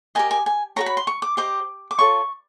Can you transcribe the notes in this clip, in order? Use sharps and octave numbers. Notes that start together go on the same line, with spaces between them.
G4 A#4 D#5 G#5
G#5
G#5
F#4 A#4 C#5 A#5
B5
C6
C#6
D6
G4 C5 D#5 D6
D6
F4 A4 C#5 C#6